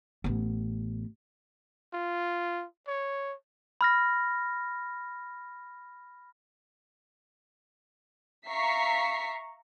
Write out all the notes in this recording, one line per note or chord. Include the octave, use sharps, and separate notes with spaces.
A1 B3
F4
C#5
B5 F6 A#6
E5 F5 A#5 C#6 B6 C7